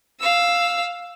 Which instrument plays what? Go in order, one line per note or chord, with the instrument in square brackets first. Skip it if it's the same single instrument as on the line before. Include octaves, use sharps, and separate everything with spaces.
[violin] F5 E6